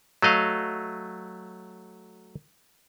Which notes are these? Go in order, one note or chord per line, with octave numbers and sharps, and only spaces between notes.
F#3 A3 D#5 F5